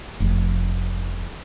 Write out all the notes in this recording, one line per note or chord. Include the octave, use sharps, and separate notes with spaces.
F1